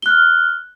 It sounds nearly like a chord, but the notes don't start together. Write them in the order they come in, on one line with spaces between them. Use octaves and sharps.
G7 F#6 F6